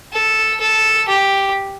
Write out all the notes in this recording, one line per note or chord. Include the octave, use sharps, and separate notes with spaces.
A4
A4
G4